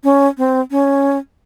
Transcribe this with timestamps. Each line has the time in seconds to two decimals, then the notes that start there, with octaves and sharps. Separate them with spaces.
0.04 C#4
0.38 C4
0.71 C#4